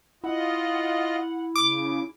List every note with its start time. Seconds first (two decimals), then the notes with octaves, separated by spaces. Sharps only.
0.24 E4 F4 D#5 F#5
1.56 C#3 D6